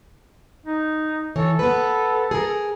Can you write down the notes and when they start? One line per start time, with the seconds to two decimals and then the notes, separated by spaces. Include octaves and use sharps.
0.66 D#4
1.36 E3 A4 C#5
1.59 B3 B4
2.31 G#4 A#4